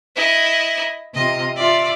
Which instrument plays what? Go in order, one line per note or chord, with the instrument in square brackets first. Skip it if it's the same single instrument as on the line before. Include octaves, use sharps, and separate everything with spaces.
[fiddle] E4 D#5
[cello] C3 F4 [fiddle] D#5
[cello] F4 E5 [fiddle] D5